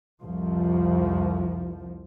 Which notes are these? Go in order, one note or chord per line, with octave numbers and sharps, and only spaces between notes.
C2 F2 F3